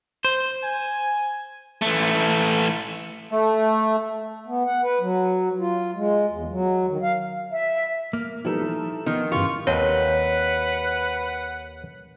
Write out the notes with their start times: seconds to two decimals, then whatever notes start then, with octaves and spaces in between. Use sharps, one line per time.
0.25 C5
0.64 G#5
1.82 E3 A3
3.32 A3
4.47 B3
4.66 F#5
4.83 B4
5.01 F#3
5.59 F4
5.95 G#3
6.30 E2
6.50 F#3
6.88 D#3
7.03 F5
7.51 E5
8.13 A#3 F6
8.45 F3 G3 B3 D#4 E4 A4
8.61 F3
9.06 D#3 F3 B3
9.32 G2 C#3 E3 F4 G4 C#6
9.67 D#2 C4 B4 C#5 F#5